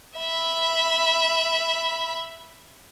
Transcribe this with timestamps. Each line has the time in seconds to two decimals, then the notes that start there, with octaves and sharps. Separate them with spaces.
0.18 E5 B5